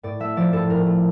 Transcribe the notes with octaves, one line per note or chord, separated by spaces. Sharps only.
A2 D5
A3 E5
F3 D5
A2 A4
A2 A#4
A3